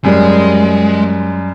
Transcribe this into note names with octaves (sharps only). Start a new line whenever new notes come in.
F#2 G3 G#3